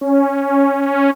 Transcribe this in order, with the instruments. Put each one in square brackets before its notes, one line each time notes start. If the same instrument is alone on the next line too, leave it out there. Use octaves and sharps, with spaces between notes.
[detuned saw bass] C#4